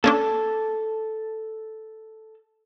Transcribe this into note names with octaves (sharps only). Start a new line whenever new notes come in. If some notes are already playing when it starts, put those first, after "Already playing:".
A#3 C#4 D4 A4 A5